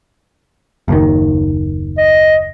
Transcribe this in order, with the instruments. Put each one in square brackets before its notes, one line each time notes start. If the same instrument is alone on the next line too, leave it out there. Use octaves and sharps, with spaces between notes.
[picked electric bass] F#1 D#2 D#3
[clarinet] D#5